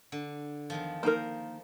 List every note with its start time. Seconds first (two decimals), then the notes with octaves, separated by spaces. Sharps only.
0.12 D3
0.70 E2 D#3 F3
1.03 A#3 D#4 A#4 C5 F5